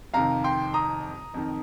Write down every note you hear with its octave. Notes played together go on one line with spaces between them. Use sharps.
F2 C3 D#3 F5 A#5
G5 C6
A#5 D#6
F2 D#3